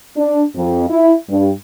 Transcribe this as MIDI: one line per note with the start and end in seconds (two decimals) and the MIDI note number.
0.17 0.43 62
0.56 0.86 41
0.89 1.14 64
1.30 1.51 43